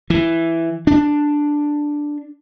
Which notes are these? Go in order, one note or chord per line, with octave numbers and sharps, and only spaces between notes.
E3
D4